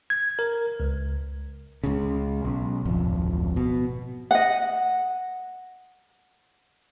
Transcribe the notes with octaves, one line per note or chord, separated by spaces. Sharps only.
G#6
A#4
C#2
C#2 C#3
B1
D1 G#1 F2
B2
D#5 F#5